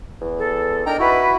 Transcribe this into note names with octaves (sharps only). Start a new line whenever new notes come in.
E2
A4
D4 D#4 A#4 G5 A#5
E4 F#4 B4